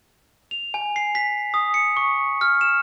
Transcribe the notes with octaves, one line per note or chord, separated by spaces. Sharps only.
F7
G#5
C7
B6
D#6
C#7
C#6
F6
E7